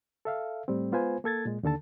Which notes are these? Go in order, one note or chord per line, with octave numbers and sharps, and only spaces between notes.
A4 E5 F5
A2 G3 A3 C4
G#3 B3 F4 B4 C5 G#5
A#3 A4 G#6 A6
A#2 G#3
D#2 D3 A4 A5